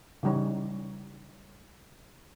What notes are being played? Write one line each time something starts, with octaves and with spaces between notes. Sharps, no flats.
C#3 E3 G3 D#4 C#5